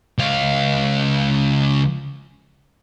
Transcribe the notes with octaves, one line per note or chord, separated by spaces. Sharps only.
C#2 F5